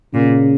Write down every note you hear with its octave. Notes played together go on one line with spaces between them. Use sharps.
A#2 C#3